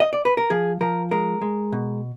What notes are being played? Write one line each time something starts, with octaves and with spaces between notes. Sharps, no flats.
D#5
D5
B4
A#4
F3 G#4
F3 A#4
G#3 A#4
G#3
B2